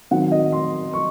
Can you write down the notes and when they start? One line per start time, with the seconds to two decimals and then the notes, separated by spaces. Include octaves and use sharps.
0.11 D#3 F#3 C4 F#5
0.32 D#5
0.52 C6
0.93 C#6